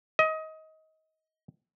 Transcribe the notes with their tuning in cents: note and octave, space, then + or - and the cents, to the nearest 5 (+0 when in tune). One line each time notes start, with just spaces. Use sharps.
D#5 +25